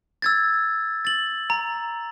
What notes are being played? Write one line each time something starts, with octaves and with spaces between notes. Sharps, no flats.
E6 G#6 A6
A6 F#7
A#5